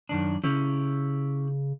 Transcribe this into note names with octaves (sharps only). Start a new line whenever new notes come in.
F#2 D#3 D4
C#3 C#4 E4 G4